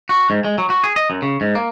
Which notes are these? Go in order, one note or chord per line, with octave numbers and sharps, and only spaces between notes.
F#4
G#2
G#3
F#3
F#4
G#4
D#5
F#2
C#3
G#2
A#3